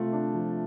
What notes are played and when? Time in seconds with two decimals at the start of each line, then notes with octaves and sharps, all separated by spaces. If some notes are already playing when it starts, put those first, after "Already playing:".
Already playing: C3 A3 F4
0.13 D4
0.34 F3